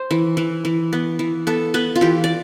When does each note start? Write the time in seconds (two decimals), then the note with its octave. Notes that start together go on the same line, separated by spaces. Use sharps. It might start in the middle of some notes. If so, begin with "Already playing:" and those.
Already playing: C5
0.11 E3
0.37 E3
0.65 E3
0.93 B3
1.19 E3
1.47 B3 A4
1.74 B3 B4
1.96 F4
2.01 E3 G4
2.24 D5